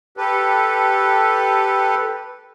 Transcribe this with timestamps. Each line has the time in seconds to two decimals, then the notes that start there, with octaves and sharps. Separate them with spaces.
0.17 G4 A4 B4